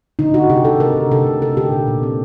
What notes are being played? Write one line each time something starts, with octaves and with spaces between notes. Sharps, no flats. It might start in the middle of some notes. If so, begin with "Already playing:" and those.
D3 D#4
D3 F#4
C3 G4
C3 A4
D3 A#4
D3
C3 A4
C3
D3 A4
D3 G4
A#2
A#2
C4